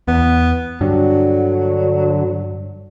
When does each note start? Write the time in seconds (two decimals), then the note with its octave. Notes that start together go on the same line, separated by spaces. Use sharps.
0.08 E2 B3
0.81 G2 D3 F#3